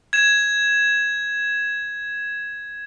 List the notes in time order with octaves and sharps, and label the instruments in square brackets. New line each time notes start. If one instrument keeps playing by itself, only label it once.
[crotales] G#6 E7